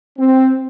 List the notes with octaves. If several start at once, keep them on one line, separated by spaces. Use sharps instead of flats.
C4